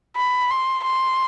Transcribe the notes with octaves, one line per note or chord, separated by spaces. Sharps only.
B5
C6
C6